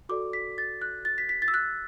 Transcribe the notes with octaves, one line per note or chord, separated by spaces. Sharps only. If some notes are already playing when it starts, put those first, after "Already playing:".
F#4 A4 D5 D6
B6
A6
F#6
A6
B6
B6
A6
E6
F#6